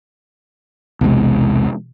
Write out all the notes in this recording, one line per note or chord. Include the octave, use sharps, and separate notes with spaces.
B1 E2 C3 G#3